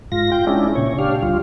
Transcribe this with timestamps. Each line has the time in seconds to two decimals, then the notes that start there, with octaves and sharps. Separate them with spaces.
0.12 G#2 F4 A#6
0.32 F4 G5
0.47 G#3 C#4 D4 E4
0.75 A#2 C#3 C#5
0.99 D4 G4 F5
1.23 D2 G3 F4